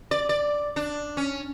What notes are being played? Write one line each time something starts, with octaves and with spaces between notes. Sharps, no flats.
D5
D5
D4
C#4